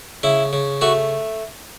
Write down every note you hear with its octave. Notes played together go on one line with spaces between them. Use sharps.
C#3 E4
C#3
A3 F#4